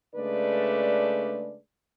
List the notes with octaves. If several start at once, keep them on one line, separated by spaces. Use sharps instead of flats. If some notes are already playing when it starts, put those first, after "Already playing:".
C#3 G#3 A3 D4 B4 D5